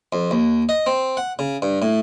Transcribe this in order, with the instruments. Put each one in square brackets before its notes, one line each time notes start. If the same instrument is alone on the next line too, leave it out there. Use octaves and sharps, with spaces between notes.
[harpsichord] F2
D#2
D#5
C4
F#5
C#3
G2
A2